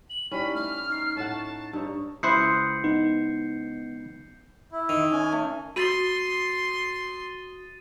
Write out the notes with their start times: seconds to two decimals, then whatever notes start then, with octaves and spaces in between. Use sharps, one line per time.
0.10 F#7
0.31 G3 C#4 D#4 E4 G#5 B5
0.55 A3 F6
0.90 D#4 C#6 C7
1.16 A2 C#5 F#5 A5
1.73 G2 D4 D#4 C#5
2.23 C#2 E4 C5 D#6 F#6 G6 C7 C#7
2.84 B3 D#4
4.72 E4
4.89 D#3
5.12 C#4 G#5
5.32 A3
5.76 F#4 C6 D#6 A6 D#7